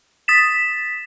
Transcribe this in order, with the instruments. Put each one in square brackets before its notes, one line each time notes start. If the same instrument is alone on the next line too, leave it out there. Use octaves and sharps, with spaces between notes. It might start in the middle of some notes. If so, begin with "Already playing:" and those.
[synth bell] D#6 A6 B6 E7